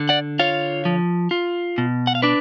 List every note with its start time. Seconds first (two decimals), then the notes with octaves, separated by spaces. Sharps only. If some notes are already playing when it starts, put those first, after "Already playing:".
Already playing: D3
0.09 D5 F#5
0.39 F4 C#5 F5
0.85 F3
1.31 F4
1.78 B2
2.07 F#5
2.15 F5
2.22 D4 B4 D5